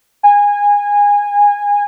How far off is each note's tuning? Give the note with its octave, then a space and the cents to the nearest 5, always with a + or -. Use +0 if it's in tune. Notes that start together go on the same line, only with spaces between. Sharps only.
G#5 -20